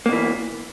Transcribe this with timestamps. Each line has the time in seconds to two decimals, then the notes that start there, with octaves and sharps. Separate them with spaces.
0.06 A#3
0.09 B2
0.12 E3